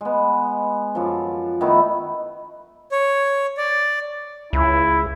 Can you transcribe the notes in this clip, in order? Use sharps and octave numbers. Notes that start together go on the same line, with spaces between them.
G#3 B3
F#2 F3
D#3 A3 B3 E4
C#5
D5
C#2 E4